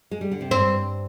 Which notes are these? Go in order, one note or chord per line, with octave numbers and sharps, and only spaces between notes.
G#3
G3
D3
C3
G2 C4